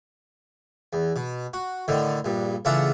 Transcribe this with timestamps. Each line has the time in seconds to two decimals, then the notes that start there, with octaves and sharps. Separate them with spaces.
0.93 E2
1.16 B2
1.53 F#4
1.88 A2 D3 D#3
2.25 A#1 G2
2.65 A1 C#3 D4 F4 E5 F#5